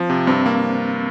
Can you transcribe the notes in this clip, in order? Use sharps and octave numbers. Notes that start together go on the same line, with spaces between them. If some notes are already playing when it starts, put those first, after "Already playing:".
Already playing: F3 C4
C3
G2 C4
A#3